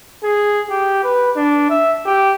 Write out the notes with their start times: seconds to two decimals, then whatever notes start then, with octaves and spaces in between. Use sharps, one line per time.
0.24 G#4
0.70 G4
1.04 B4
1.37 D4
1.70 E5
2.06 G4